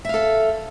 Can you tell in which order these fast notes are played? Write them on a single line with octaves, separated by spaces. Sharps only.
E5 F5 A4